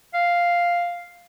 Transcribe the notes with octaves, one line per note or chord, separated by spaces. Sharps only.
F5